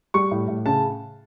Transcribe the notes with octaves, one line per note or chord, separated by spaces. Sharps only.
G3 C#6
A2
A2
C#3 A5